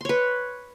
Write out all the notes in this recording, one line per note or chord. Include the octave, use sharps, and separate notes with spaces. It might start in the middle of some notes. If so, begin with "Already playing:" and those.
B4 C#5 C6